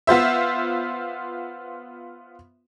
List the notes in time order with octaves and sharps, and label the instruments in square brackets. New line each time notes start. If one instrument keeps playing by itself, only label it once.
[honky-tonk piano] B3 F4 C5 E5